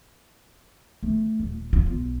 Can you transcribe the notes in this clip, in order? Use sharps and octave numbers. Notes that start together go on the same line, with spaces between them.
A3
D#1
F4
B1